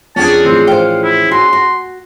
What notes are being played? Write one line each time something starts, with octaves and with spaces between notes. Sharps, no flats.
F2 C#4 D4 G#4 G5 A5
A2 E3 F3 C4
C5 F5 G5
E4
F#4 G#5 C6
F#4